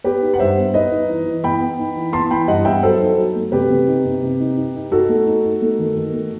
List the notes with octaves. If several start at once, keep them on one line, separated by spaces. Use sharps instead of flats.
B3 G4 B4
D#4
F#5
G2 C5 E5
B3
D#4 B4 D#5
D#4
E3
E3
B3 G5 B5
B3
D#4
E3
B3 A5 C6
E3 G5 B5
G2 D#5 F#5
B3 E5 G5
F#3 A4 C5
D#4
F#3
A3
C3 G4 B4
C3
D#4
C3
C3
D#4
D#4
D#4
D#4 F#4 A4
A3
D#4
D#4
A3
D#3
D#3
A3